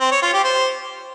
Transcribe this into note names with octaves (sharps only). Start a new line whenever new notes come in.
C4
C#5
F4
G4
C5